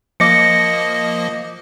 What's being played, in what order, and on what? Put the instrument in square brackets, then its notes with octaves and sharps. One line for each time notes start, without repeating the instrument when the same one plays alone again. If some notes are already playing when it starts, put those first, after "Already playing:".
[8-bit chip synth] F3 A#3 D#5 [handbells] D6 A#6 C#7